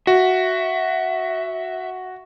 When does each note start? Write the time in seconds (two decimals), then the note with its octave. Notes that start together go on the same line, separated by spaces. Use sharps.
0.07 F#4 E5